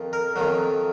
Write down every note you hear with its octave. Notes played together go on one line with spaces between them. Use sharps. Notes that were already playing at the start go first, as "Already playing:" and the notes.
Already playing: F2 D#3
A#4
F2 D#3 F#3